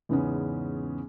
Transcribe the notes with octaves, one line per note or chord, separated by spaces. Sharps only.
E2 G#2 C#3 B3 C#4